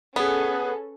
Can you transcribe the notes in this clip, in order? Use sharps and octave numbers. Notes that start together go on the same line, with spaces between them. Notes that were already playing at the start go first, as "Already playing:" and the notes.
B3 C#4 G#4 A4 B4